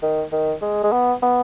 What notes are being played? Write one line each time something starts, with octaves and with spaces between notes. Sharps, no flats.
D#3
D#3
G#3
G#3
B3
B3